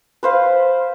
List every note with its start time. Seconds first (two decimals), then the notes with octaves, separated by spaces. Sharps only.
0.23 B4 C5 F5